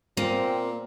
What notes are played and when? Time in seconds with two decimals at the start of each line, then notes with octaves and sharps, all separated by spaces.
0.17 A#2 A#3 C4